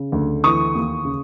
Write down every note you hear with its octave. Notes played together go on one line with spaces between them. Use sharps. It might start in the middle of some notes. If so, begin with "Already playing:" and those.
Already playing: C#3
D2
E3 C#6 D#6
D#2
C#3